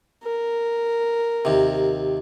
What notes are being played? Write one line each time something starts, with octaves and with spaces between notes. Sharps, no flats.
A#4
D#2 C3